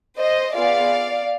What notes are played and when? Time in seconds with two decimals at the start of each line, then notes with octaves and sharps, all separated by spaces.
0.18 C5 D#5
0.55 B3 F4 G#4 D5 F5